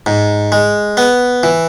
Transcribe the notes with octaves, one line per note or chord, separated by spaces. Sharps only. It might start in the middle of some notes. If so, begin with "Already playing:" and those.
G#2
G#3
B3
E3